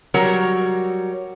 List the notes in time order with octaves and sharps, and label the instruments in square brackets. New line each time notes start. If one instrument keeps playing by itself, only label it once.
[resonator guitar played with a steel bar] F#3 G3 F#4 A#4 C#5